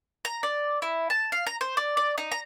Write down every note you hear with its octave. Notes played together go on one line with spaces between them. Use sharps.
A#5
D5
E4
A5
F5
A#5
C5
D5
D5
D#4
A#5